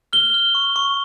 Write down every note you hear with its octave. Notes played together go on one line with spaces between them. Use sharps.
F6 G7
F6
C#6
C#6